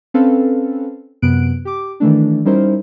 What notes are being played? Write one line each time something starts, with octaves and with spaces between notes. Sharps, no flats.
C4 C#4 A4 B4 F5
F#2 C3 B3 F#6 D7
G4 D6
D#3 E3 A3 D4
G3 C#4 D#4 E4 A#4 C5